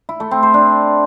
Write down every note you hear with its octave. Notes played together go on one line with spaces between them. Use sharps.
E4
A3
C4
C5
D4